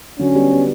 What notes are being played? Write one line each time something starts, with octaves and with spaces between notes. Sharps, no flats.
D3 F#3 C#4
G3 B3
G3 B3